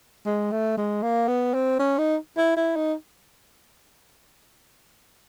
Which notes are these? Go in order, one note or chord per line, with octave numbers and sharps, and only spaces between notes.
G#3
A3
G#3
A#3
B3
C4
C#4
D#4
E4
E4
D#4